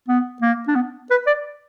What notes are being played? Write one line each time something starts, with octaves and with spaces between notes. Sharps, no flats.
B3
A#3
D4
B3
B4
D5